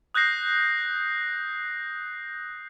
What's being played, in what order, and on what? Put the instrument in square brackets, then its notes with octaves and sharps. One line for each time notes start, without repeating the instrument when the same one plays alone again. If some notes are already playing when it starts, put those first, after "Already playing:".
[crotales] D#6 F#6 G6 A#6 C7